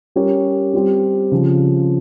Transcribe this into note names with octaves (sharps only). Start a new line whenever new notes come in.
G3 C#4 G4 A#4 C#5
G3 C4 G4 C5
C#3 F3 C4